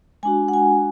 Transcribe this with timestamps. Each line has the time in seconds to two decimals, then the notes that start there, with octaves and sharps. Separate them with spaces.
0.23 G#3 D4 F#4 G#5
0.48 F#5
0.53 G#5